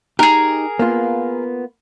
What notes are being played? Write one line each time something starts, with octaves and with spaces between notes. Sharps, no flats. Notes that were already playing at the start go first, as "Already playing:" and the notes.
D#4 G4 G#4 A#4
A#3 B3 F4